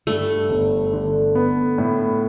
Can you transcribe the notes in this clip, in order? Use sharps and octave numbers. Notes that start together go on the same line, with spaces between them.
G2 A3
G1
D3
B3
A2